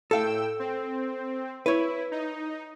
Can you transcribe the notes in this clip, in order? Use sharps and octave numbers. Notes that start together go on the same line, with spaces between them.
A2 A4 F5 G5 E6
C4
E4 B4 C#5
D#4